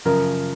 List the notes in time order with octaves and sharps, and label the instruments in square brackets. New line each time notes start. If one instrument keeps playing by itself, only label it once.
[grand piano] F#2 C#3 F3 [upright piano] A#4